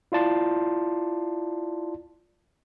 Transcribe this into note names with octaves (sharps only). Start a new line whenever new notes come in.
E4 F4 D5 A5 C6